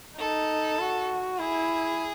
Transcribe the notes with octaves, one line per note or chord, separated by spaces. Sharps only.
D#4 A4
F#4
E4 G#4